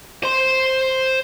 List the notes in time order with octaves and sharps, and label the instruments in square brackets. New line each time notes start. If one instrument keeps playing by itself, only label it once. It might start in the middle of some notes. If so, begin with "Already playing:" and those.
[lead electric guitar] C5 C6